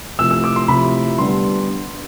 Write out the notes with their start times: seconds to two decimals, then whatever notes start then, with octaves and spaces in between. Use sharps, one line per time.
0.19 C3 F3 A3 E4 E6
0.31 E6
0.44 D6
0.56 C6
0.68 C3 F3 A3 E4 B5
1.18 D3 G3 B3 D4 C6